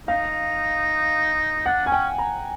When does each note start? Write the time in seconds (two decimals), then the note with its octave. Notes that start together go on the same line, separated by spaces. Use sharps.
0.08 D#4 F5
1.66 D4 F#5
1.86 C#4 G#5
1.92 G5
2.18 A#5